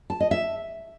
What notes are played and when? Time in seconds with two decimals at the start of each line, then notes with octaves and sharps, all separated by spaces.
0.10 A5
0.20 D#5
0.31 E5